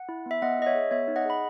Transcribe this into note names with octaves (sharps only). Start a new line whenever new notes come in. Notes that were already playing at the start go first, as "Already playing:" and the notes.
Already playing: F#5
E4
B3 E5
B3 D#5 F#5
E4 D#5
C#5 E5
G#4
B3 C#5 E5
D#4
D#5 F#5
G#4 B5